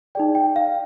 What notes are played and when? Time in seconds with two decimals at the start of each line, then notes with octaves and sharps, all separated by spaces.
0.15 D#4 G#4 D5 G5
0.35 G5
0.56 F5